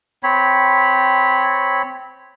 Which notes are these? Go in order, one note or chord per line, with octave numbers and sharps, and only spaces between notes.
C4 C#5 B5